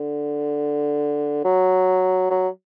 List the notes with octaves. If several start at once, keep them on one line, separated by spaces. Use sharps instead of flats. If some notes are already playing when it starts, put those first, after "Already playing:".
Already playing: D3
F#3
F#3